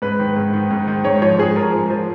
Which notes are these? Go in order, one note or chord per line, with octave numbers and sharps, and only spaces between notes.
G#2 B4
D#3
G#2
D#3
G#2
D#3
G#2 C#5
F3 C#5
G#2 G#4
F3 A#4
G#2
F3